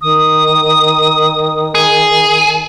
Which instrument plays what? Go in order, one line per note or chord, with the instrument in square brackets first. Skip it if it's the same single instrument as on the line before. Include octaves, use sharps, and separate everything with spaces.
[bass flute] D#3 [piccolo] D#6
[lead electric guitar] G#4